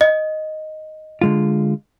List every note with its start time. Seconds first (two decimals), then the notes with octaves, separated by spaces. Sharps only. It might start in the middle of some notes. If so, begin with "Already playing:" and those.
0.01 D#5
1.21 D3 G#3 F4